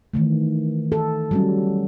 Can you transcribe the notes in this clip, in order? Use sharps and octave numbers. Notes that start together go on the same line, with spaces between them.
D#3 E3 A3
A4
F#3 G3 C#4